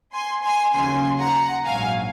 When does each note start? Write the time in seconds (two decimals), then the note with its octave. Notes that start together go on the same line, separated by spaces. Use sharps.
0.13 G#5 C6
0.44 G#5 C6
0.75 D#2 C#3 F#3 G#5 C6
1.20 F#5 A#5
1.65 A#1 G#2 F#3 F5 G#5